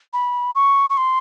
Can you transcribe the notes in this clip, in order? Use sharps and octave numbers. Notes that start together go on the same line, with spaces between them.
B5
C#6
C#6
C6